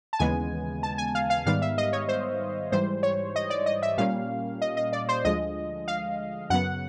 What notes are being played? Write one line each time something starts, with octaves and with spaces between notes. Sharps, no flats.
A5
D#2 C#3 E3 G#3 B3 G#5
A5
G#5
F5
F5
G#2 D#3 G3 B3 F5
E5
D#5
C#5
C5
G#2 E3 G3 C5
C#5
D#5
D5
D#5
E5
A#2 G3 A#3 C#4 F5
D#5
D#5
D5
C5
D2 D3 F3 G#3 D#5
F5
F#2 C#3 F#3 B3 F#5